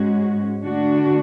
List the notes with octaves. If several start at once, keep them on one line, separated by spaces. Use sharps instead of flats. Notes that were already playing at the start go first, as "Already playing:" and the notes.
Already playing: G#2 G#3 C#4 F#4
D3 A3 D4 F#4